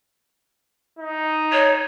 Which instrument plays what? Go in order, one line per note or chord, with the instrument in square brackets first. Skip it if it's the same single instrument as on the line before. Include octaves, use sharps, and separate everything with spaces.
[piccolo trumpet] D#4
[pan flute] C#5